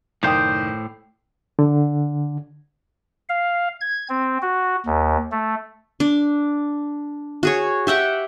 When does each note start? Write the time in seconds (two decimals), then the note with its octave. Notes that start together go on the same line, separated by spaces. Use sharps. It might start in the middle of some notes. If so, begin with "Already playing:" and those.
0.23 F#1 A2 D#3 C5 D5 G5 D#6
1.59 D3
3.29 F5
3.81 G#6
4.09 C4
4.42 F#4
4.86 D#2
5.32 A3
6.00 D4
7.43 F#4 G#4 C#5
7.87 G4 E5 F#5 G5